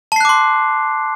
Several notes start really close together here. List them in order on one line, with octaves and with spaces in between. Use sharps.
A5 C7 F#6 D6 C6